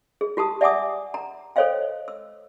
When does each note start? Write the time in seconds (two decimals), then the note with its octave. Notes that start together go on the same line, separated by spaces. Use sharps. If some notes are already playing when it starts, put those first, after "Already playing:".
0.21 G#4
0.37 F4 G4 A5 D#6
0.61 D5 E5 F#5 G#5 D6 D#6
1.14 A#5
1.56 A4 C5 C#5 D#5 F5 G5
2.08 E6